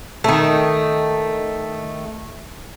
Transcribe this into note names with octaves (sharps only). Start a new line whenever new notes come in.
D#3 A3